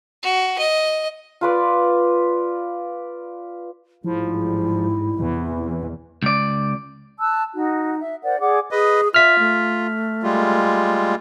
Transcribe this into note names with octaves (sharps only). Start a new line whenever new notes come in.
F#4
D#5
F4 B4 D5
A1 G#2 F3 G3 E4
E2 C3 E3
C#2 D5
A5 E6 F#6
D#4 F#4
E5
A#4 C5 D5 F#5
G#4 D5 F#5 D6
G#4 B4 D#5
F4 E5 F6 B6
A3
G3 G#3 F4